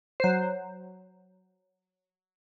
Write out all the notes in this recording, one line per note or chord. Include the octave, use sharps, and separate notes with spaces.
F#3 C5